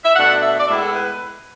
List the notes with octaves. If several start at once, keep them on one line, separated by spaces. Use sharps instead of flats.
E5
B2 A3 D4 F#5
E5
D5
A2 G#3 B3 E4 E5
A4
B4